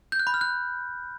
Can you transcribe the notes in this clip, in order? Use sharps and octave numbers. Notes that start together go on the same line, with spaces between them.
G6
F#6
B5
F6
F#6